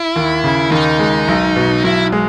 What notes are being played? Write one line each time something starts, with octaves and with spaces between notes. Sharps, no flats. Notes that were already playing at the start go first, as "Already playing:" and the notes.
Already playing: E4
D#2
C#3
D#2 D#4
G#3
B1
B2
B1 E4
G#3